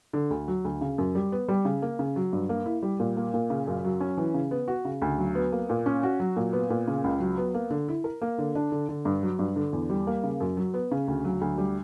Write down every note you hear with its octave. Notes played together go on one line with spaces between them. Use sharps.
D3
D2
F#3
D2
C#3
F#2
G3
B3
G3
C#3
A#3
C#3
F#3
G2
A#3
E4
G3
A#2
A#3
A#2
C#3
F#2
F#3
C#4
E3
C#3
B3
F#4
C#3
D2
F#3
B3
A#3
A#2
C#4
F#4
F#3
A#2
B3
A#2
C#3
C#2
F#3
B3
A#3
D3
E4
A#4
A#3
D3
D4
D3
D3
G2
F#3
G2
D3
E2
G3
A#3
C#3
F#2
F#3
B3
C#3
D2
F#3
D2
G3